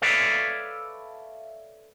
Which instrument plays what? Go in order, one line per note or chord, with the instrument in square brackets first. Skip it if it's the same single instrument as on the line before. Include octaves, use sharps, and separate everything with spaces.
[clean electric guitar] A4 B4 C#5 D5 E5 F5